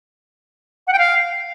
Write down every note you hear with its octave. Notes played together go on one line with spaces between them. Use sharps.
F#5
G5
F5